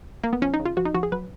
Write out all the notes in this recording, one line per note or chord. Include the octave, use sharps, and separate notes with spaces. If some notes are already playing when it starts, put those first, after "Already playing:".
A#3
B3
F3 C#4
D#4
C#3
F4
F3 F#4
D#4
F3 F#4
G#4
F#3 B4